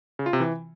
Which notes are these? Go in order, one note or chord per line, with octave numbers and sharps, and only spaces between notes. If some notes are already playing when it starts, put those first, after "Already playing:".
C#3
F4
C3
E3